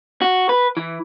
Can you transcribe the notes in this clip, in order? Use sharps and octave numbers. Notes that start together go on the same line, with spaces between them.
F#4
B4
E3